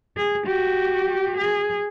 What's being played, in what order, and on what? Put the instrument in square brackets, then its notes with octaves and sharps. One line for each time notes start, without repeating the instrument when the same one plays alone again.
[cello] G#4
F#4 G4
G#4